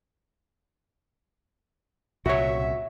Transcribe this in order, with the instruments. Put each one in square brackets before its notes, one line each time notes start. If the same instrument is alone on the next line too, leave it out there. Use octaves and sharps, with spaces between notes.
[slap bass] C2 A#2 C#3 [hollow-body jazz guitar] F#4 C#5 [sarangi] E5